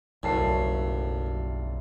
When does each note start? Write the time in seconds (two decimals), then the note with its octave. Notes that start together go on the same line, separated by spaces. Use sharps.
0.23 F#1 B1 F#2 G3 A3 G4 A5 C7